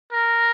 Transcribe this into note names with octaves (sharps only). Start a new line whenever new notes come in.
A#4